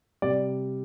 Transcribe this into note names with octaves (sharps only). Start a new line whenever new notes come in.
C3 G3 D5